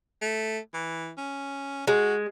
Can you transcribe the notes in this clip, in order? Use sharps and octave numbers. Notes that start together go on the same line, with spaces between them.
A3
E3
C#4
G#3 F#4